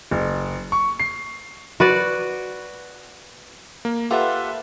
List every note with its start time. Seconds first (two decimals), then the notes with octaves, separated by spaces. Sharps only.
0.11 F#1
0.72 C#6
1.00 C7
1.80 F#4 B4 D5
3.85 A#3
4.10 F4 G4 A4 B4 E5 F#5